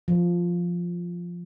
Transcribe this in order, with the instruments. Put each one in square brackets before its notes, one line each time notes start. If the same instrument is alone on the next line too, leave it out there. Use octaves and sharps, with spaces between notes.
[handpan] F3